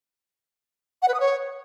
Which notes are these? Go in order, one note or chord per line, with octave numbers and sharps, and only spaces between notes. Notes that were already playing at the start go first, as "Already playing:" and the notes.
F#5
B4
D#6
C#5